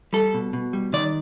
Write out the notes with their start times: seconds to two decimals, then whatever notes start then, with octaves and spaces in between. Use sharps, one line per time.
0.13 G3 A4
0.34 B2
0.53 B2
0.73 G3
0.93 D#3 D5